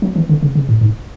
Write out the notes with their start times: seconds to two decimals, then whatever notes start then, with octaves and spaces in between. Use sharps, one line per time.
0.02 F#3
0.16 E3
0.29 D3
0.43 C#3
0.55 C#3
0.69 A2
0.81 G#2